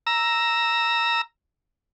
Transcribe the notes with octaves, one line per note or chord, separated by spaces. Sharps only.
A#5 E6